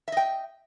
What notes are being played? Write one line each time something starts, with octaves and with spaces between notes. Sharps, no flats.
D#5 E5 G5